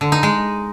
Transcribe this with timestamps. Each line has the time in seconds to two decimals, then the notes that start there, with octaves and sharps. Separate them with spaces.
0.01 D3
0.12 D#4
0.23 G#3